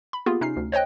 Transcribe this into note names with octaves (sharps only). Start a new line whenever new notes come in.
B5
A#3 B3 F4 G4 G#4
C3 C#4 D#4 F6 C7
D2
C5 C#5 D#5 G5 F#6